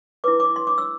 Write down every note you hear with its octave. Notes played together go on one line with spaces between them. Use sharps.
E4 B4 D6
D6
C6
D6
E6